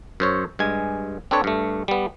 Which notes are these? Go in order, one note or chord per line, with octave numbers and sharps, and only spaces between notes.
F#2 C5 C#5
G2 G#3 G#5
C4 D4 A4 B4 C#5
G2 A3
G3 B3